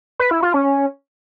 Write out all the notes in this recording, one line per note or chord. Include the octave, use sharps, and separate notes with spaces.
B4
E4
F4
C#4